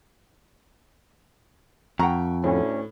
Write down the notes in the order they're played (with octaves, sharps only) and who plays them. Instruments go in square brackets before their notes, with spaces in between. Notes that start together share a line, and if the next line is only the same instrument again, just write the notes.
[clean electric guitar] F2 [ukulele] F#5 A#5 [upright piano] G5 C#6
[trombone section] D2 C#4 [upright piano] A2